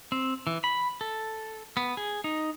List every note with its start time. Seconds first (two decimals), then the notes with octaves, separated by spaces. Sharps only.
0.12 C4
0.47 E3
0.64 B5
1.01 A4
1.77 B3
1.97 G#4
2.24 D#4